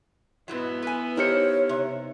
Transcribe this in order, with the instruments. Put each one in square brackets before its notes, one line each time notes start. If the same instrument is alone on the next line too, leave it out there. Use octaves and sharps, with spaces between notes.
[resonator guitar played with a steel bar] G#2 B2 F#3 [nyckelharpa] B3 E4
[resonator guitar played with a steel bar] B4 G#5
[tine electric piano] D#4 G4 C#7 [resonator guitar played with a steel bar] A#4 C5 [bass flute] C#5
[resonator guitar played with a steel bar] C3